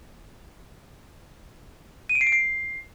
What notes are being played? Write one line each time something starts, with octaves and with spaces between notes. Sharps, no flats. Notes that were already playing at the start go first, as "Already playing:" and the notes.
D#7
D7
C7
D7
C7